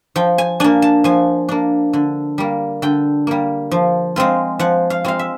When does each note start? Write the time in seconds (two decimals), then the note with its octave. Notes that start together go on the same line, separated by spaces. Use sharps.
0.16 F3 G5
0.38 G#5
0.60 A#3 D4 G#5
0.82 A5
1.04 F3 G#5
1.49 A#3 D4
1.93 D3
2.38 G3 A#3
2.82 D3 G5
3.27 G3 A#3
3.71 F3
4.16 G#3 C4 F4
4.59 F3 F#5
4.90 F5
5.04 G#3 C4 F4 F5
5.19 E5